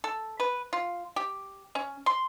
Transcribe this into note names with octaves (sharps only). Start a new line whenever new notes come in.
A4
B4
F4
G4
C#4
C6